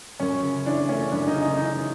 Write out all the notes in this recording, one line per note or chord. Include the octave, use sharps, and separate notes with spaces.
F#2 C#4
C#3
E3 D4
A3 C#4
F#2 D4
D#4
C#3
D#4
E3 D#4